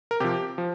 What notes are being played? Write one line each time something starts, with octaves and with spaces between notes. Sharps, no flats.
A#4
C3 F3 G4
F3